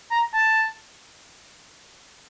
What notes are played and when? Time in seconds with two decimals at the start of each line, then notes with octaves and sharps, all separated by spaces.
0.11 A#5
0.34 A5